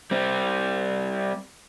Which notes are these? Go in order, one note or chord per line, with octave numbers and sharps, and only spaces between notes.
G3 C4